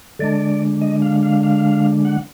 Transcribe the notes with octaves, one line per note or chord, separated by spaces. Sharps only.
D3 G#3 D4 D5
D#5
F5
F5
F5
F#5